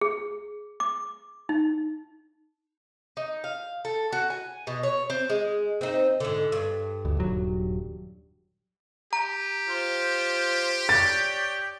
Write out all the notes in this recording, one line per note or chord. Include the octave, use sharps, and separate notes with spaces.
G#4
D6
D#4
D#4
F5
A4
F#4
G#5
B2
C#5
C4
G#3
C4 D#4
G#2 D3
G2
D2
D#1 F#3
G4 A#5
F4 C5
C#5 D5 G5 A6